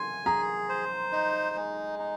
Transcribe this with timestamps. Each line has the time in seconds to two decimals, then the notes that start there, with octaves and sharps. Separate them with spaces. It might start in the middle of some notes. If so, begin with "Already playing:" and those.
Already playing: G#5 C6
0.26 G#4 A#5
0.69 C5
1.12 D#4
1.56 G#3
1.99 D#4